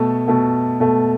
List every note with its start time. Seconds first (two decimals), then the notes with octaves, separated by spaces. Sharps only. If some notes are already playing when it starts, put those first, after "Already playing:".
Already playing: B2 A3 A4
0.28 B2 A3
0.80 B2 A3